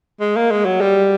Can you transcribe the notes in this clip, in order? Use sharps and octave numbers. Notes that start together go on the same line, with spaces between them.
G#3
A#3
G#3
F#3
G3